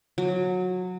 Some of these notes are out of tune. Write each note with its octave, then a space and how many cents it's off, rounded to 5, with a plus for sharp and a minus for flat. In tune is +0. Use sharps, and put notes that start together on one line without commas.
F#3 -20